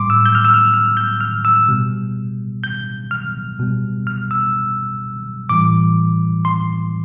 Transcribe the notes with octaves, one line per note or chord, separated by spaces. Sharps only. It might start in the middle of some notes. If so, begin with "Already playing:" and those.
Already playing: A2 G3 C6 D6
E6
G6
F6
E6
F6
F6
G6
F6
E6
B2 G3
G6
F6
B2 G3
F6
E6
A2 E3 G3 D6
C6